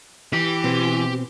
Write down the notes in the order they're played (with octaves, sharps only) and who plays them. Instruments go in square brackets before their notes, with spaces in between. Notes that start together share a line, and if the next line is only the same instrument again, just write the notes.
[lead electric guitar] E3 [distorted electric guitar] G4
[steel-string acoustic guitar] B2 C4 C5